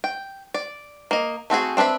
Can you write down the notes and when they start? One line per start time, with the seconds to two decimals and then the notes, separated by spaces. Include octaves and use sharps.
0.04 G5
0.54 D5
1.11 A#3 D#5
1.50 A3 C4 F#4 G#4
1.77 C4 D4 A#4 B4 E5